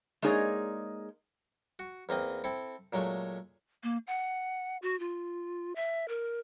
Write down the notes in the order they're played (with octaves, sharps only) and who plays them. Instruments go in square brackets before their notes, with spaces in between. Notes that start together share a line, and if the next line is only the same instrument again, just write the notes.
[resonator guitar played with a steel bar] G#3 A#3 D#4 G#4 C#5 D5
[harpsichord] F#4
E2 A#3 C4 D#5
C4 E4 A4
A#2 F#3 G#3 A3
[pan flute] A#3
F#5
F#4
F4
E5
A#4